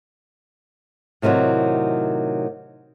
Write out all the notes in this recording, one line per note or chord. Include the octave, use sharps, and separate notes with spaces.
A2 C3 D#3 F3 F#3